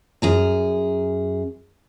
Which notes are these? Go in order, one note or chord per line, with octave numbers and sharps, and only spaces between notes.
F#2 G#4 A#5